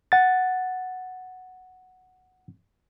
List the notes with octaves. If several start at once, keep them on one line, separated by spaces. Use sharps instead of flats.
F#5 A6